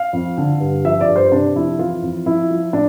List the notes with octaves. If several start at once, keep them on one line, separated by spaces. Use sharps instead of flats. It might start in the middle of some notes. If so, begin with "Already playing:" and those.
Already playing: F5
F2
D3
G2
F3 E5
D5
G2
C5
C3 D4
F2 E4
E3 F4
F2
F3 E4
F3
A2 D4